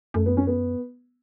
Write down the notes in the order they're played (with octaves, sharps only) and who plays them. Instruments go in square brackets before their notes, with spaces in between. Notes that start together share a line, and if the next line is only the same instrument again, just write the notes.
[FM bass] F#2 [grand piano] A3
[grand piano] B3
C#4
B3